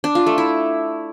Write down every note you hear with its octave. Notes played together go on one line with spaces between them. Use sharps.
D4
F4
A3
E4